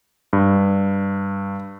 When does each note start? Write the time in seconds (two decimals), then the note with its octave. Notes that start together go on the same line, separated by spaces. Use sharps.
0.33 G2